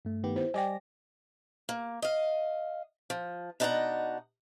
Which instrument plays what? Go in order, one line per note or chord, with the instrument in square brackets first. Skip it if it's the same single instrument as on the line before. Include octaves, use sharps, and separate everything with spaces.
[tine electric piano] G2 A3
[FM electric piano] D#3 B3 G4
[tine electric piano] E4 [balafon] C5
[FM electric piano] G3 D5 A#6 [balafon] D#5 G5 [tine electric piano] G#5
[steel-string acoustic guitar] A#3
D#5 F5
F3
B2 D4 D#4 F#4 F#5 A#5